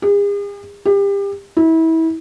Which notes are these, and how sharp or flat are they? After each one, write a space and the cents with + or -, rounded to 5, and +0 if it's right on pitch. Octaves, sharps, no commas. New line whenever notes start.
G#4 -45
G4 +30
E4 -30